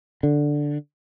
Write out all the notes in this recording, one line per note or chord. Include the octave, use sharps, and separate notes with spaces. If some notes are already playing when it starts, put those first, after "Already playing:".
D3